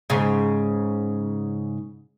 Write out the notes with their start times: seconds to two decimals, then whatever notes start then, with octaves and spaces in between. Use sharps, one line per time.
0.10 G#2 C#3